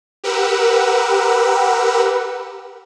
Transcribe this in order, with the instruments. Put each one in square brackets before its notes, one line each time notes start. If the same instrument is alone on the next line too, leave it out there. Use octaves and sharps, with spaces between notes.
[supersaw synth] G4 A#4 B4 F#5 E6